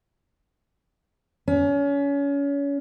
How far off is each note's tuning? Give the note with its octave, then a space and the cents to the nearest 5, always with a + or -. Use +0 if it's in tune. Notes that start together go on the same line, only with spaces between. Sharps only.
C#4 +30